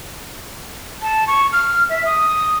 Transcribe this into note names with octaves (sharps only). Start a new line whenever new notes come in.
A5
C#6
F6
E5
D#6